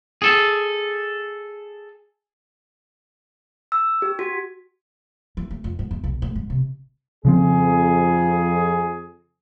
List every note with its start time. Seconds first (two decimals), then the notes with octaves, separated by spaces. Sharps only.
0.22 G#4 A4
3.72 E6
4.02 G4
4.19 F#4
5.37 E3
5.51 A3
5.64 F2
5.79 G#2
5.91 E2
6.04 B1
6.22 A2
6.36 G#2
6.50 C3
7.25 F2 C#3 F3 C4 G#4